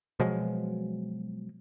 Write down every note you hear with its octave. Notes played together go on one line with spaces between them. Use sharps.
B2 F3 F#3 G#3